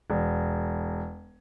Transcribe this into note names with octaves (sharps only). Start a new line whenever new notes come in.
E1